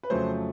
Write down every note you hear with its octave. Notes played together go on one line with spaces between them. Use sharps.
B4
F2 C#3 F#3 A3 C5